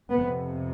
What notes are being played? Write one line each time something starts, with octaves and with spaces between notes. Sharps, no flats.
F2 C3 B3